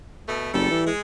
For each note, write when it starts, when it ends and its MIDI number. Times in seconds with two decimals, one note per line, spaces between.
0.28 0.51 47
0.28 0.51 57
0.54 0.69 30
0.54 0.81 55
0.54 0.81 69
0.70 0.90 52
0.87 1.01 56